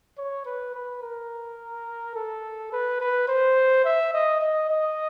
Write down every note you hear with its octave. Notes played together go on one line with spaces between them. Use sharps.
C#5
B4
B4
A#4
A4
B4
B4
C5
E5
D#5
D#5
D#5